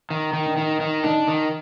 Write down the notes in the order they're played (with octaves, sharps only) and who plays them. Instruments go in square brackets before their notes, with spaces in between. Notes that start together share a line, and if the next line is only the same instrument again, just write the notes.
[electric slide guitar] D#3
D#3
[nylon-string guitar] D4
[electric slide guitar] D#3 [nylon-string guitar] D#4
[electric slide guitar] D#3
[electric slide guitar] D4 [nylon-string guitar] D#4
[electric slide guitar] D#3